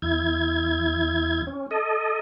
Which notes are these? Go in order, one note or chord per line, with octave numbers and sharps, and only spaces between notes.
E2 E4 G#6
C#4
A4 D#5